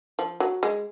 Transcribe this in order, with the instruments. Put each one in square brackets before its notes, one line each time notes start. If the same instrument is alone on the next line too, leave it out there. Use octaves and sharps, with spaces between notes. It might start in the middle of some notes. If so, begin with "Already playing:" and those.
[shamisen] F3
F#3
G#3